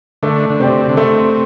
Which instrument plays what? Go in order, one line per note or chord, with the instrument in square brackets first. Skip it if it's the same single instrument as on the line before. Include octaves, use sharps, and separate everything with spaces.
[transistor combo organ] D3 [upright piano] A3
[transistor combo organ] D3
[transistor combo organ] C3 [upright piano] C4 G4 D5
[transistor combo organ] D3
[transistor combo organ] C3 [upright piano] A3